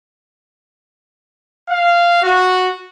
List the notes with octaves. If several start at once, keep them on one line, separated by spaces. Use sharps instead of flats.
F5
F#4